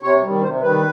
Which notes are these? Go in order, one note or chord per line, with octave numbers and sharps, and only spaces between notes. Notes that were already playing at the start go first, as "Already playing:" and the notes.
C3 C#5
D#3 G3
C3 C5
D#3 G3 B4